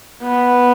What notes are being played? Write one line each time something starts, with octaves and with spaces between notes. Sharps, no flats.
B3